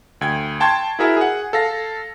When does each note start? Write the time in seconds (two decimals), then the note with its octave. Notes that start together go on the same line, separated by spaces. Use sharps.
0.21 D2 G5 G#6
0.60 G5 A5 C6 C#6 G#6
0.99 E4 F#4 G#4 A#4 E5
1.17 G#4 F#5
1.53 A4 F5 A#6